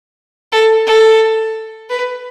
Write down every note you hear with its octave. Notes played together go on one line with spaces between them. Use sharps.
A4
A4
B4